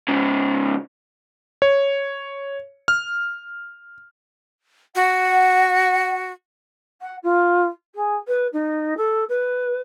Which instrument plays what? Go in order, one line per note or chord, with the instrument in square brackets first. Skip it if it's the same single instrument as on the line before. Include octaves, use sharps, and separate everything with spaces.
[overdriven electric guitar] G#2 C#3
[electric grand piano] C#5
F6
[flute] F#4 [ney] F#5
[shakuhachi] F#5
F4
G#4
B4
D#4
A4
B4